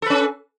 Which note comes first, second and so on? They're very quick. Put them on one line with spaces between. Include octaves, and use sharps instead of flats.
A4 B4 C#4